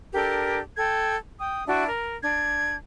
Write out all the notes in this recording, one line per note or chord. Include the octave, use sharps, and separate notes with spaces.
D4 G4 A4 A#4
A4 G5 G#6
G5 D#6
D4 E4 F#4
A#4
D4 G#6